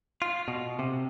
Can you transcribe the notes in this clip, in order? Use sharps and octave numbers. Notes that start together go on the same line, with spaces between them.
F4
B2
C3